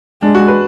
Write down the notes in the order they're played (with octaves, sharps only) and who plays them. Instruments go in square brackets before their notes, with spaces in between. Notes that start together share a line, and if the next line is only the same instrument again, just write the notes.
[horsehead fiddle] G#3 [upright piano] D4
[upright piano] F#4
B4